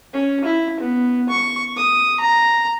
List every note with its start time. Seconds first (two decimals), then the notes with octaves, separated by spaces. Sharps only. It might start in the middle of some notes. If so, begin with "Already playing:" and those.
0.13 C#4
0.45 E4
0.80 B3
1.29 C#6
1.76 D#6
2.20 A#5